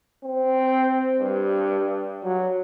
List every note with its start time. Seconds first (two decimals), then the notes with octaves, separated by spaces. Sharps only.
0.24 C4
1.19 G2
2.23 F#3